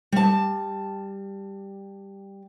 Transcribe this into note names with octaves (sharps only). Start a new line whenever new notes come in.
G3 A5